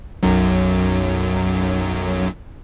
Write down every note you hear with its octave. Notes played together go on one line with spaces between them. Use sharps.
B1 F#2 F#3